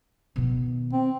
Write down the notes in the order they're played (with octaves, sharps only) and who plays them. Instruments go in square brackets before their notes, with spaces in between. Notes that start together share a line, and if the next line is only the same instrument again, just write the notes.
[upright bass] B2 D#3
[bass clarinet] C4